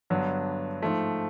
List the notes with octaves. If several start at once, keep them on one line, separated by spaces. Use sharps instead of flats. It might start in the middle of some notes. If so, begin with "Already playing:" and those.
G2 D3 F#3 B3 D4
G#2 F3 A3